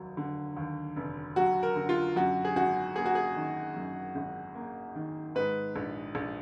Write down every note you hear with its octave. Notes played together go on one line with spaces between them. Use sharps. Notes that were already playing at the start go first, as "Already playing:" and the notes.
Already playing: F1 D#2 F#3
D3
D#2
F1
F#3 F#4
A#4
D3
F4
F#2 F#4
G#4
G#1 F#4
A#3 G#4
F#4
G#4
D#3
F#2
G#1
A#3
D#3
G#2 B4
A#1
A#1